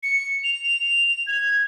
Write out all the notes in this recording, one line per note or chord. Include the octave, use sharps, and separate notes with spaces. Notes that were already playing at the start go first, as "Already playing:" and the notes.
C#7
F7
G#6